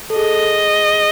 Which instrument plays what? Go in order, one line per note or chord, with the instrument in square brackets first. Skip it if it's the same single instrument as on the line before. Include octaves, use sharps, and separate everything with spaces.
[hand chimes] A4
[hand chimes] G#4 [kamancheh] D#5